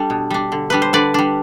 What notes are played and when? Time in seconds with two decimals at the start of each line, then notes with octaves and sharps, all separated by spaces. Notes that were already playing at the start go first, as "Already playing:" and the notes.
Already playing: G3 D4 A4
0.10 B2
0.30 G3 D4
0.52 D3
0.70 G3 D4 B4
0.82 C5
0.93 D3 B4 D5
1.14 G3 D4